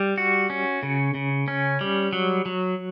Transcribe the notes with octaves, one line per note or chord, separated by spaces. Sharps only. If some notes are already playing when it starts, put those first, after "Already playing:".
Already playing: G3
F#4
C#4
C#3
C#3
C#4
G3
F#3
F#3